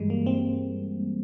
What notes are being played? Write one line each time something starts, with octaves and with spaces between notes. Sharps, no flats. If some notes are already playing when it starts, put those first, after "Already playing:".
Already playing: G2 E3 G3 G#3
A#3
C4